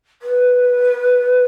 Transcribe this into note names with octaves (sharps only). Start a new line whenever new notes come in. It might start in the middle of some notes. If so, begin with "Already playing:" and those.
B4